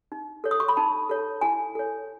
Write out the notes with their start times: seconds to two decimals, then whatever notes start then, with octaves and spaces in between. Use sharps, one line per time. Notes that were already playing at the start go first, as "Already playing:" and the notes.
0.12 D#4
0.44 A4 C#5
0.51 D#6
0.60 C#6
0.68 B5
0.77 D#4 A5
1.09 A4 C#5
1.41 E4 G#5
1.75 A4 C#5